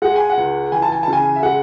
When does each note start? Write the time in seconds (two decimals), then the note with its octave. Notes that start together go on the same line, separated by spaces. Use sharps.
0.02 G#3 F#5
0.16 G#5
0.29 F#5
0.37 C#2
0.72 E3 G#5
0.82 A5
0.92 G#5
1.03 C#3 A5
1.13 G#5
1.36 E5
1.43 G#3 F#5